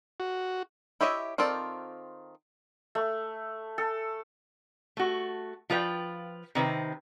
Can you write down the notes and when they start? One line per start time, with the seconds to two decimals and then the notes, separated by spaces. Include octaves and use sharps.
0.20 F#4
1.01 E4 G4 C#5 D#5 E5
1.38 D#3 C4 F4 A4 D5
2.95 A3
3.78 A4
4.97 A3 F#4
5.70 F3 F4 B4 C5 G5
6.55 C3 D#3 B4 C5